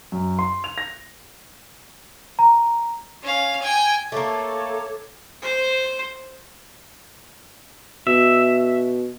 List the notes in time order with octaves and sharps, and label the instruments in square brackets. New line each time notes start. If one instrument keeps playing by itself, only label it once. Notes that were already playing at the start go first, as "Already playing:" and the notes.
[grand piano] F#2
C6
F7
A#6
[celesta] A#5
[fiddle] C#4 F5
G5 G#5
[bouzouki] A3 A#3 [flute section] A4 C#5 D6
[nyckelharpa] C5
[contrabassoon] B2 [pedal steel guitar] E5